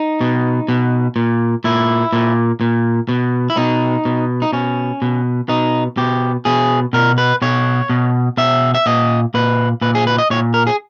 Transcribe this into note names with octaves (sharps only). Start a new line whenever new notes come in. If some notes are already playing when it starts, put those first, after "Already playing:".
Already playing: D#4
B2
B2
A#2
A#2 E4
A#2
A#2
B2
E4
B2 D#4
B2
D#4
B2 C#4
B2
B2 D#4
B2 G4
B2 G#4
B2 A#4
B4
B2 C#5
B2
B2 E5
E5
A#2 D#5
A#2 B4
A#2 B4
G#4
B4
D#5
A#2 C#5
A#4
G#4